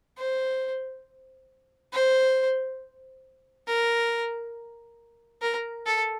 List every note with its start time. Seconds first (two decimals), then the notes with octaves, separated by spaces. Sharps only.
0.18 C5
1.93 C5
3.68 A#4
5.42 A#4
5.86 A4